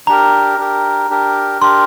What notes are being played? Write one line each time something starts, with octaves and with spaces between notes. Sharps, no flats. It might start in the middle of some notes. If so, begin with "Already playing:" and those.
D4 G4 A#4 A#5
D4 G4 A#4
D4 G4 A#4
D4 G4 A#4 C6